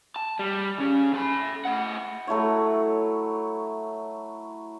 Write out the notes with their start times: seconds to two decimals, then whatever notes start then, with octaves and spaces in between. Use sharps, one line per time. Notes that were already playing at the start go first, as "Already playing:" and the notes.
0.16 A5
0.39 G3
0.79 C#3 C#4
1.14 A4 B5
1.65 A2 F#5
2.27 F#3 A3 E4 C#5